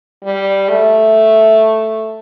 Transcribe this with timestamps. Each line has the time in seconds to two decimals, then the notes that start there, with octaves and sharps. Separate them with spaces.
0.24 G3
0.69 A3